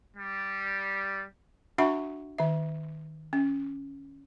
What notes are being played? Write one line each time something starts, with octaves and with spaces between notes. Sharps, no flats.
G3
D4 F#4 E5 F#5 B5 C#6
D#3 E5
C#4